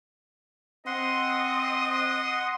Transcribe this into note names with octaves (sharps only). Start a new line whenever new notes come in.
C4 D#5 F#5 C6